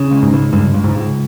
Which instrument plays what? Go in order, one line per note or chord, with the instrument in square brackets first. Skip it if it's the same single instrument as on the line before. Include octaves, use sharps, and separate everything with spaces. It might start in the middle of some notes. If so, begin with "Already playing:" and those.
Already playing: [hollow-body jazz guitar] C#3
C#2
[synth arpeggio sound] G#2
[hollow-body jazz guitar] C#2
[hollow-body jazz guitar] C#2 [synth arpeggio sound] G2
[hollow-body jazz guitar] C#2
[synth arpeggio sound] G#2
[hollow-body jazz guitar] C#2